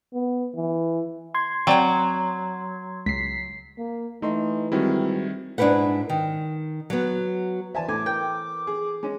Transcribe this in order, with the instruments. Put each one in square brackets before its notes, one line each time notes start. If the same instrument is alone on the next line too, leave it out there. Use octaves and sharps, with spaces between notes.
[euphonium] B3
E3
[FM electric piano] C6 G#6
[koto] F#3 [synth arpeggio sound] C4 D5 G5
[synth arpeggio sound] C#2 [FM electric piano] B6 C7
[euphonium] A#3
[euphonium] E3 [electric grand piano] A3 C6 [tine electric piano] D#4 D#5
[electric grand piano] D#3 G3 E4 [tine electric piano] G#3 C4 F#4
[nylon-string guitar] G#2 D4 E4 G4 B4 F#5
D#3
F#3 B3
[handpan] E3 B4 C5 [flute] D5 [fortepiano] E5 G#5 A5
[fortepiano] A2 [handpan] A4 [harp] G#5 [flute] D6
[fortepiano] A#4 [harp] G5
[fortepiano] G#4
G#3 C#4